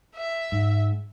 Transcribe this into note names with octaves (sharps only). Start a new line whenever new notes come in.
E5
G#2